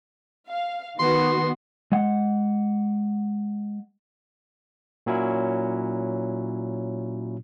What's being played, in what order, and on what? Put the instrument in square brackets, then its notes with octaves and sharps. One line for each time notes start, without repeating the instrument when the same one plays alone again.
[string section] F5
[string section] D#3 B3 F#4 [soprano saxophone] C6
[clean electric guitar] G#3 F#5
[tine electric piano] A#2 F#3 C#4 E4